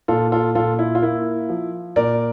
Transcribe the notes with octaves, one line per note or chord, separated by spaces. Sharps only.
A#2 F4 A4
F4 A4
A#2 F4 A4
E4
F4
A#3 E4
F3
A#2 A#4 D5